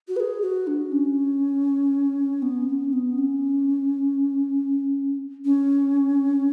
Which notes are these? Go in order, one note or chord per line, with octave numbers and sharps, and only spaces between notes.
F#4
B4
G#4
F#4
D4
C#4
B3
C#4
B3
C#4
C#4